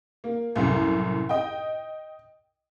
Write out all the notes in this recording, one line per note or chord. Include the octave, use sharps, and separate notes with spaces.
A#3
C2 F#2 A2
D#5 G5